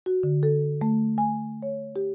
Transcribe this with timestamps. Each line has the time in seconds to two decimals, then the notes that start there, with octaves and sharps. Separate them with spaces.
0.06 F#4
0.23 D3
0.43 A4
0.81 A3
1.18 G#5
1.62 C#5
1.96 G4